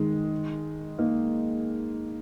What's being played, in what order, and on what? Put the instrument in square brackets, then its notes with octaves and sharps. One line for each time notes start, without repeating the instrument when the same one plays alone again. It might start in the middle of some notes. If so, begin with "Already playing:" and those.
Already playing: [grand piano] D#3 G#3
A#3 D#4